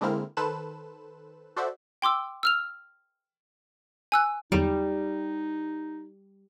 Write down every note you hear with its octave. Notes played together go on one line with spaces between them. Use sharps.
D3 G#3 A#3 C4 E4 F6
D#3 A4 B4 C5 F#6 E7
F#4 A4 C5 D5 E5 F#5
G5 C6 D6 E6
E6 F6 F7
G#5 E6 F#6
E2 D3 F#3 G3 D#4